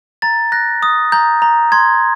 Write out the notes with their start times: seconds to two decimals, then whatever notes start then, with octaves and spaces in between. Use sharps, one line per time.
0.22 A#5 A6
0.52 F#6 A#6
0.83 D#6
1.12 A#5 G6
1.42 A#5
1.72 C6 G#6